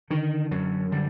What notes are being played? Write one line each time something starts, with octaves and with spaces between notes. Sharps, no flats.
D3 D#3
F#2 F#3
D3 G3